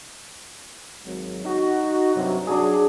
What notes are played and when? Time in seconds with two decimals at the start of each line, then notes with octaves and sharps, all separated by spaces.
1.06 G#1 F#3
1.45 D#4 F#4
2.15 G2 C3 F#3
2.47 F#3 D4 G#4